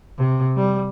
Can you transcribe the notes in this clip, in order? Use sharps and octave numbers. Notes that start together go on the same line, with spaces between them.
C3
G3